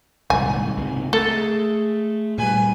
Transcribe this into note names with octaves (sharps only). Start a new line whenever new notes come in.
D#1 C2 G#2 G#5
C#2 G#2 C3
G#3 A3 A4
A#2 G3 B4 G#5